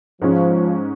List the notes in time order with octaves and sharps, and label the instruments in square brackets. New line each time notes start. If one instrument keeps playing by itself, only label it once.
[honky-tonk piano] G#2 G#3 C#4 [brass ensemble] F3